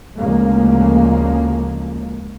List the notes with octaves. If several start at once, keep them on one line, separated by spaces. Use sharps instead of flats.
D2 C#3 F3 G#3 A#3